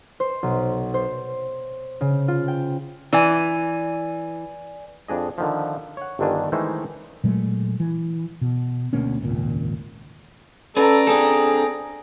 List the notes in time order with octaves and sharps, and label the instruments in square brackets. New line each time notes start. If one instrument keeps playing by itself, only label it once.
[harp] C5
B1
C5
C#3
F4
G5
[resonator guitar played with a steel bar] E3 [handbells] D5 G#5
[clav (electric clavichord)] F2 D4 G#4 D#5
D3 D#3 F3
C#5 F#5
G1 G2 D3 D#3 D4 G#5
D#3 E3 G#3 A3 D#4 C5
[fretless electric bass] A#2 F#3 G#3 A3
E3
B2
D2 B2 A#3 C#4
D#1 G#1 C#2 A#2
[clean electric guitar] C#4 B4 [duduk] A4 [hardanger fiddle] D5 A#5
[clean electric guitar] C4 D4 A4 [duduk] G#4